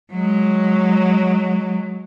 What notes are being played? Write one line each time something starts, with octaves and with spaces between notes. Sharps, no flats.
F#3 G#3